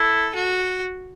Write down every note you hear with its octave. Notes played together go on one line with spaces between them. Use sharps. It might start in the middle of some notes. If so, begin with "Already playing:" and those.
Already playing: E4 A4
F#4